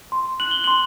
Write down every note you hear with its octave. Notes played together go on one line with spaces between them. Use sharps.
C6
F#6 F#7
G7
C6 F#7